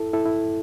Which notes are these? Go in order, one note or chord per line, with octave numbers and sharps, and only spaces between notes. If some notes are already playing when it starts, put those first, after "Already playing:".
Already playing: E4 A4
E4 A4
E4